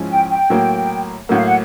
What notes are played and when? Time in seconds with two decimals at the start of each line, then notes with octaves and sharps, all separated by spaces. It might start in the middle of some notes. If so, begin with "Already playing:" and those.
Already playing: G#2 F3 G#3 C#4 E4
0.09 G5
0.30 G5
0.50 A2 F#3 A#3
1.29 A2 F#3 A#3 F#5
1.37 F5
1.45 F#5